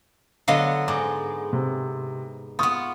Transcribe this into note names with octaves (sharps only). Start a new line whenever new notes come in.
D3 F#3 B3 D#5 F5
G#2 G#3 D6
C3
B3 F4 C#6 D#6